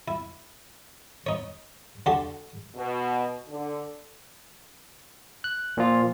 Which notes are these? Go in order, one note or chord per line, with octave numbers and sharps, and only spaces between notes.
E4
D#4 C#5
D3 F#4 G4 F#5 A5 C6
B2
D3
F#6
A#2 F3 F4